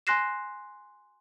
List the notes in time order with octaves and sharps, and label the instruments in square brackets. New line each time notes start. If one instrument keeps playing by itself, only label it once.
[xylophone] G#5 C6 F#6 A#6 C7 E7